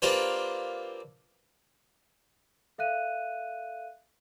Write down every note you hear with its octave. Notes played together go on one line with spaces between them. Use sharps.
A#3 C4 D4 F4 G4 B4
A4 E5 F5 F#6 D#7